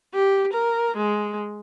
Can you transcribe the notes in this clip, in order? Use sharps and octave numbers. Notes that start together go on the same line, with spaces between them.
G4
A#4
G#3